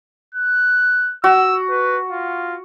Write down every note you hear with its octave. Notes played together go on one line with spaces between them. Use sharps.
F#6
F#4 E6
B4
F4